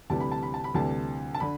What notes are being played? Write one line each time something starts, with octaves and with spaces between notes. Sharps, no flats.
D2 C3 E3 G3 A5
B5
A5
B5
A5
B5
D2 C3 E3 G3 A5
A5
D3 B5